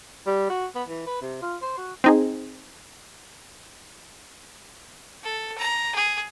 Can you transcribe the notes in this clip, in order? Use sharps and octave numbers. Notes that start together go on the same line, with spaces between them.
G3
F#4
B3
E3
B4
C3
F4
C5
F#4
C4 D#4 G#4
A4
A#5
G#4